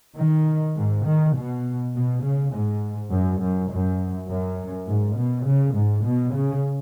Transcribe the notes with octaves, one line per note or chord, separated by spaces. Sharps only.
D#3
G#2
D#3
B2
B2
C#3
G#2
F#2
F#2
F#2
F#2
G#2
B2
C#3
G#2
B2
C#3